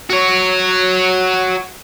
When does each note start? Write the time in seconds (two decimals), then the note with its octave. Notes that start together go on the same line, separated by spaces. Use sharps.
0.10 F#4 C#5